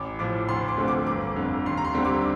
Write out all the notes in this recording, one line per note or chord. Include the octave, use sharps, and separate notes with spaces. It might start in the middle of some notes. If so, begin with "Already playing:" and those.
Already playing: A1 D6
A2 F3 D6
D2 C6
D6
D3 F3 A3 C4
D6
G1 D6
F2 D3
D#2 C6
A#5
C6
D3 G3 C4
D6